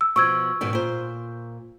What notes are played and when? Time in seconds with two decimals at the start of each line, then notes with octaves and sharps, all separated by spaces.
0.01 E6
0.16 B2 F3 C#6 E6 G#6
0.61 G#2 B2 D#3
0.73 A#2 C5